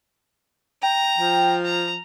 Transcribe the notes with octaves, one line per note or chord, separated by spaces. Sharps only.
G5 A#5
F3
A#5